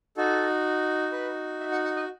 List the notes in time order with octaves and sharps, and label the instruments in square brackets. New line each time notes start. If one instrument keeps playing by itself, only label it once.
[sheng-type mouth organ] D#4 F#4 A4
B4
E5
F#5
F#5
D#5